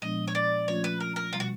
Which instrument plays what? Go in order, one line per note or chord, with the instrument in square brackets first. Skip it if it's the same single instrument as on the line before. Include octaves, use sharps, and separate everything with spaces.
[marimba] A#2 F3 G#3 B3 D4 [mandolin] D#5
[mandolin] C#5
D5
[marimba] F3 A3 C#4 F4 [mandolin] C#5
[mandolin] B4
A#4
A#4
[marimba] B2 G3 [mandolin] F4
[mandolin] F#4